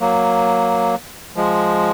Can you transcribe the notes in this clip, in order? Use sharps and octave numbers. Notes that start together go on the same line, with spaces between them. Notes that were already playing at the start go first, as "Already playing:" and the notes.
F#3 A#3
F3 G#3